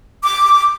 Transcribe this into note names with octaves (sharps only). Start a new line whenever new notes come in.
D6